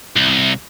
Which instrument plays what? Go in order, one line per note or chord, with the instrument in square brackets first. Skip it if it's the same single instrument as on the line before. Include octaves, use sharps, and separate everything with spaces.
[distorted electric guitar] C2